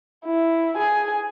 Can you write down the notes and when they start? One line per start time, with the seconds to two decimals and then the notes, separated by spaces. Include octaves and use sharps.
0.25 E4
0.76 G#4 G#5